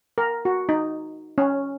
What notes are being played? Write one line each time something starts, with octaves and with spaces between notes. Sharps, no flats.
A#4
F#4
D#4
C#4